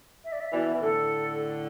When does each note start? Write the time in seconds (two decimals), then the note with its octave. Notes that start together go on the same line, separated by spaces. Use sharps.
0.25 E5
0.32 D5
0.40 E5
0.52 B2 E3 D5
0.74 E3
0.81 A2 D3 A4